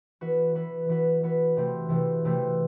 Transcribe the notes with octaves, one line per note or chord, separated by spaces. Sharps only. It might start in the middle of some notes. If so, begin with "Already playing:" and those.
E3 B3 F#4 B4
E3 B3 F#4 B4
E3 B3 F#4 B4
E3 B3 F#4 B4
C3 E3 A3 C4
C3 E3 A3 C4
C3 E3 A3 C4